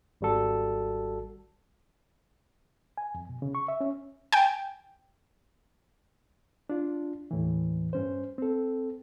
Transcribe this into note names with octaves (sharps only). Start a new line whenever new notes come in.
G#1 G3 F#4 A4
G#5
F2
B2
C#3
C#6
E5
C#4
G5 G#5
D4 F4
D#2 A2 E3
G2 C#4 C5
C4 A4